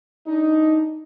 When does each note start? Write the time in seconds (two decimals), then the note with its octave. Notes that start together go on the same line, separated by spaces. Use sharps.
0.27 D4 D#4